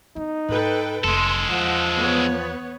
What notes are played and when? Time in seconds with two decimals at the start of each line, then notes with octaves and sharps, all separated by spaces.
0.16 B3 D#4
0.49 G#2 A4 B4 G5
1.04 F1 G#3 A4 C6
1.51 E2 F3 F#5
1.97 B3 C#5